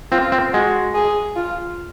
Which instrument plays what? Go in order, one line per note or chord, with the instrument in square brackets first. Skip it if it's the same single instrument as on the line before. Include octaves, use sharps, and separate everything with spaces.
[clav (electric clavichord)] C4 [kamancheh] F4
[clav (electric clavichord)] C4
[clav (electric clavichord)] G#3 [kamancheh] F#4
[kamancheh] G#4
F4